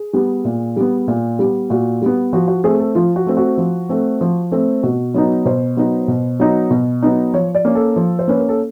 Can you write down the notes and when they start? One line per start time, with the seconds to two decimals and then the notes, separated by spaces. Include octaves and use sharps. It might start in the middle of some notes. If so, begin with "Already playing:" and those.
Already playing: G#4
0.13 G3 B3
0.45 A#2
0.76 G3 B3
1.08 A#2
1.39 G3 B3
1.70 A#2 F#4
2.02 G3 B3
2.33 F3 F#4
2.48 F#4
2.64 A3 C4 G#4
2.80 A4
2.95 F3 F4
3.16 F#4
3.27 A3 C4
3.37 F#4
3.58 F3
3.89 A3 C4
4.21 F3
4.51 A3 C4
4.83 B2 F#4
5.14 F#3 B3 D#4
5.45 B2 C5
5.77 F#3 B3 D#4
6.08 B2
6.40 F#3 B3 D#4
6.71 B2
7.02 F#3 B3 D#4
7.34 F3 C#5
7.55 D5
7.65 A#3 C#4
7.75 A4
7.96 F3
8.19 C5
8.27 A#3 C#4 B4
8.39 A#4
8.49 A4